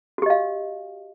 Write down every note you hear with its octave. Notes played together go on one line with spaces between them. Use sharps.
F#4 G4 D#5 F5